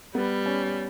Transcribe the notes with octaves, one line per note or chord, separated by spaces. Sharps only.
G3 B3
C#4